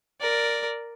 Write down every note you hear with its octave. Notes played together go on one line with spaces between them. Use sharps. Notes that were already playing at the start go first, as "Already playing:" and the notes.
A#4 D5